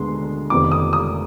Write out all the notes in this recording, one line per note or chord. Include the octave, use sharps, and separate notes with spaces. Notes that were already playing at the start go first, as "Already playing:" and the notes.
Already playing: D2 D3 G#3 B3 C6
F1 F2 C3 D#3 B3 D6
D#6
D#6